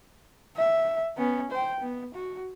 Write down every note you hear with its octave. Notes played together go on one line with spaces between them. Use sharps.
E5
B3 C#4
C5 G5
B3
F#4